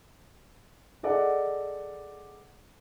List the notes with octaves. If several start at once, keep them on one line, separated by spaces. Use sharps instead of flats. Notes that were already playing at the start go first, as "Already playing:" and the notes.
G#4 A4 D5 D#5 F#5